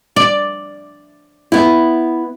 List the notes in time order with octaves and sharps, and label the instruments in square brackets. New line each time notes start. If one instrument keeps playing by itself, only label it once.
[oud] D5
[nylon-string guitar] B3 E4